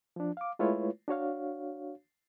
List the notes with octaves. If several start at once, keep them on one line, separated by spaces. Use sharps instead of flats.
F3 D4
F5 D6
G#3 A3 E4 F4 B4 C#5
D4 F#4 C#5 F5